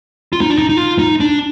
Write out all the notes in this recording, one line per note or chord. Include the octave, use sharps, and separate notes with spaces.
F4
D#4
D4
D#4
D#4
F4
D#4
D4